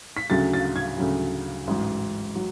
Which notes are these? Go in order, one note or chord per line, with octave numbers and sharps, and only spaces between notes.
B6
D2 C#3 F#3 A6
A6
G#6
D2 C#3 F#3
A1 G#2 F#3
F#3